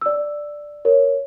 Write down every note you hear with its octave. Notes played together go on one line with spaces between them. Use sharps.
D5 E6
A#4 C#5